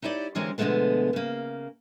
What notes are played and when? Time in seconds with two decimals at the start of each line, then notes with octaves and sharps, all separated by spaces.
0.02 D#4 E4 G4 C#5 D5
0.35 D3 E3 G#3 C4 C#4 A#4
0.58 B2 D3 F3 G#3 A3 B3
1.13 C#3 A#3